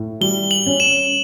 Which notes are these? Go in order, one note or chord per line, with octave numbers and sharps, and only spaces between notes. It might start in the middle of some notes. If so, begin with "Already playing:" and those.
Already playing: A2
G3 G7
F#7
C#4
E7